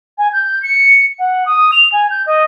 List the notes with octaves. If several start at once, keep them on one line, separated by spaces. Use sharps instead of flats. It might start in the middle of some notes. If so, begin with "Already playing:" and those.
G#5
G6
C#7
F#5
D#6
F7
G#5
G6
D#5